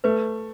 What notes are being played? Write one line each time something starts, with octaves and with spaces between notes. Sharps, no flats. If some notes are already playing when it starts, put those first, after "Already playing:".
A3 B4